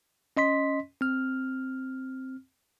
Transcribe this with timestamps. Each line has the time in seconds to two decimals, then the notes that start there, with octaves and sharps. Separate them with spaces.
0.37 C#4 D#5 C6 B6
1.01 C4 F6